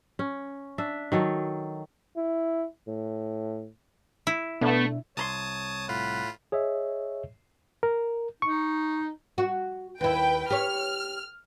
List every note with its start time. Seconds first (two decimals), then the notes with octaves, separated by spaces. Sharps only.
0.19 C#4
0.78 D4 E5
1.12 D#3 F#3 A4
2.17 E4
2.88 A2
4.27 E4
4.61 B2 A3 B3 D4 E5
5.17 C2 C#5 A5 A#5 C6 D#6
5.89 A2 F4 F#5 B5
6.52 G#4 C#5 D#5 E5
7.83 A#4
8.42 D#4 C#6
9.38 F#4
10.01 D#2 E4 B4 G5
10.50 G4 C#5 F6